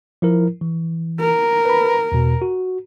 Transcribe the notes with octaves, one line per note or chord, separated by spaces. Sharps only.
F3 E4 A#4
E3
A#4
B4 B5
E2 B2
F#4